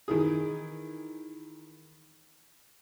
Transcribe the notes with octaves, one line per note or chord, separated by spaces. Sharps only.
D#3 E3 G#4